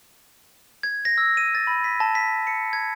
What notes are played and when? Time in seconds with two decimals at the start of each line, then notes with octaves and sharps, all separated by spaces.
0.83 G#6
1.05 A#6
1.18 E6
1.37 D#7
1.55 A6
1.67 B5
1.84 B6
2.00 A5
2.15 B6
2.47 C#7
2.73 G#6